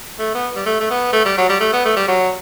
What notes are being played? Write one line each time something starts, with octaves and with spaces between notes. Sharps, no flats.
A3
B3
G3
A3
A3
B3
A3
G3
F#3
G3
A3
B3
A3
G3
F#3